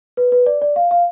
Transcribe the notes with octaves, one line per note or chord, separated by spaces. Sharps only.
B4
B4
D5
D5
F5
F5